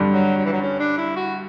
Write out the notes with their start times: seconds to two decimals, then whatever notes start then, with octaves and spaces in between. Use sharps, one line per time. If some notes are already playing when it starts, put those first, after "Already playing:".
Already playing: G2 D3 G3
0.13 F#3
0.37 F#3
0.45 E3
0.53 F#3
0.61 C#4
0.79 D4
0.98 E4
1.16 F#4